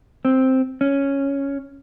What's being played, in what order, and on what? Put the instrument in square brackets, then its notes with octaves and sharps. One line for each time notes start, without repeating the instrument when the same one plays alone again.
[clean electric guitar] C4
C#4